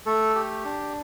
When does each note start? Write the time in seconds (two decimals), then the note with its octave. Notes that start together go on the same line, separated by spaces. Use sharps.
0.06 A3 A4
0.35 G4
0.65 D4